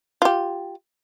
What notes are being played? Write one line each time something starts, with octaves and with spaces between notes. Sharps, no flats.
F4 G4